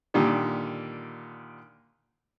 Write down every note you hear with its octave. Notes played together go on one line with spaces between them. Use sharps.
A#2 D3 D#3 G3